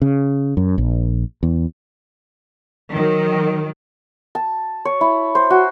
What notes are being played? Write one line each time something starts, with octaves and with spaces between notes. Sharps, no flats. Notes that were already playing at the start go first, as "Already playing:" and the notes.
C#3
F#2
A#1
E2
D#3 F#3
A5
C#5
E4
C5
F#4